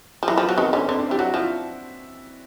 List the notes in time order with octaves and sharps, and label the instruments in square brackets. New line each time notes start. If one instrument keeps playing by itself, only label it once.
[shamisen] F3
[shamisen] E3 [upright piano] F#3
[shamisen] F3
[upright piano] B3
[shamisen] F#3
[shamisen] D#3 [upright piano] C4
[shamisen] D3 [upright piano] C#4
[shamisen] D3 [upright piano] C4
[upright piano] D4
[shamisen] G3 [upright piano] E4
[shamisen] F#3 [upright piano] F#4
[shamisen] F3 [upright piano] E4